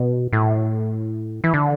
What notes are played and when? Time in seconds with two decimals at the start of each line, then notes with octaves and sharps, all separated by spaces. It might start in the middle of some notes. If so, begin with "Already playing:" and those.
Already playing: B2
0.33 A2
1.44 E3
1.54 D3